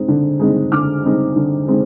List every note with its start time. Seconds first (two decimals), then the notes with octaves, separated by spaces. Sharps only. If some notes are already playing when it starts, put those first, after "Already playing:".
Already playing: G#3 C4 D#4
0.08 D3
0.39 G#3 C4 D#4
0.72 D3 D6 F6
1.05 G#3 C4 D#4
1.36 D3
1.67 G#3 C4 D#4